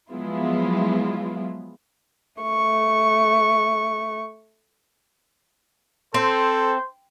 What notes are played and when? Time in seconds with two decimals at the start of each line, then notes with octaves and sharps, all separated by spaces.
0.10 F3 F#3 G#3 B3 E4 F4
2.42 A3 C#6
6.14 C4 A4 C5